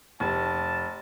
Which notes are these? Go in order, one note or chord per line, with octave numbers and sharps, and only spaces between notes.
F1 A5